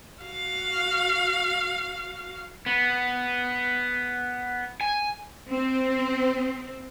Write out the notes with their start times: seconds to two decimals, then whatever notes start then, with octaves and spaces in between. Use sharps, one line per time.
0.20 F#4 F5
2.66 B3
4.81 G#5
5.49 C4